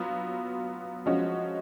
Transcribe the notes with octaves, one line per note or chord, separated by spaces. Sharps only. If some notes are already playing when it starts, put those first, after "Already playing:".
Already playing: F#3 B3 F4
F3 G#3 C#4 F#4